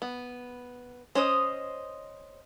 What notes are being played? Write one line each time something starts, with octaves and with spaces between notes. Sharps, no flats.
B3
C#4 C5 D#5 D#6